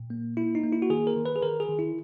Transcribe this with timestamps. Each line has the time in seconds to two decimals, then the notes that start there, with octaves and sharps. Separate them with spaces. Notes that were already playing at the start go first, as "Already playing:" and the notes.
Already playing: A#2
0.10 A#3
0.37 A#3 E4
0.55 D#4
0.64 A#3
0.72 E4
0.82 F#4
0.90 D#3 G#4
1.07 A#4
1.16 D#3
1.26 B4
1.36 G#4
1.42 D#3 A#4
1.60 G#4
1.69 D#3
1.79 E4